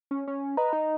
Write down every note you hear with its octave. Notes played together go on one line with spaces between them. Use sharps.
C#4
C#4
B4 D#5 A#5
D#4